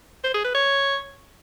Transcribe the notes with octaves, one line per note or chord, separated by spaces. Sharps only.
C5
G#4
B4
C#5